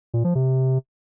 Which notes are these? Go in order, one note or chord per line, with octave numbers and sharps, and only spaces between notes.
A#2
F3
C3